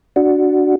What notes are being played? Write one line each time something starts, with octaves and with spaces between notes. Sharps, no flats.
D4 F#4